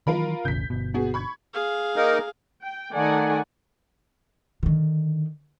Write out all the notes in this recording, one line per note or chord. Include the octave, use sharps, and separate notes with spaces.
D#3 E3 F#3 F4 A#4 B5
E1 A1 C#3 G6 B6
G1 B2
B3 F#4 G#4
B5 C#6 G#6
G#4 F5
A#3 D#4 A#4
G5
D#3 A3 A4 D5 F#5 G#5
D3 D#3